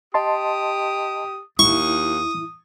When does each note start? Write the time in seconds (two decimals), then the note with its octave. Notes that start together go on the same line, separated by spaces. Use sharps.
0.14 G4 D#5 A5 C6 D#6
1.59 D#2 E4 C#6 D#6